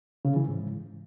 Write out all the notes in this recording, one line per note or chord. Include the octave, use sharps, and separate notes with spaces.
C#3
E3
G#2